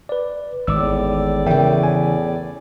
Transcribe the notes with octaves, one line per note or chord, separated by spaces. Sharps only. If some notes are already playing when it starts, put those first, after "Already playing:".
B4 D5
G#1 E2 A2 D5 D6 E6
C#3 E3 A#4 E5 G5
G#5